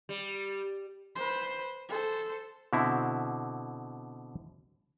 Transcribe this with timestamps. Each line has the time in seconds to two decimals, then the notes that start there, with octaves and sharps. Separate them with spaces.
0.09 G3
1.15 B4 C5
1.89 A4 C5
2.73 B2 D3 C4 E4